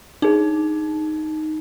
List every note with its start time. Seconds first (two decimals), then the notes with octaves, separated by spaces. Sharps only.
0.22 D4 D#4 G#4